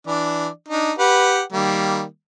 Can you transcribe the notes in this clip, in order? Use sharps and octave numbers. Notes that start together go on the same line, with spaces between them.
E3 D4 D5
D4 D#4
G4 B4 F#5
D#3 G3 A#3